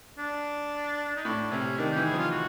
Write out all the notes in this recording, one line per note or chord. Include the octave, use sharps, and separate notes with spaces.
D4
D#4
A2 D4
C3 C#4
D#3 D4
E3 G4
G#4
F3 F4
F#4